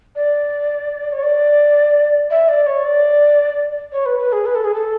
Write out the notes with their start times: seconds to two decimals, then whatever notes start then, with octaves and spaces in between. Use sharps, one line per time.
0.15 D5
1.12 C#5
1.23 D5
2.31 E5
2.48 D5
2.66 C#5
2.84 D5
3.92 C#5
4.06 B4
4.19 B4
4.32 G#4
4.46 B4
4.55 A4
4.65 G#4
4.74 A4